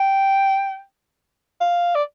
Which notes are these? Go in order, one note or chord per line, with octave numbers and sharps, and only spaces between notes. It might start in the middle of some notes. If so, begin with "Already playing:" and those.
Already playing: G5
F5
D5